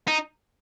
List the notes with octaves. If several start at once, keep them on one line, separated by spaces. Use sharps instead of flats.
D#4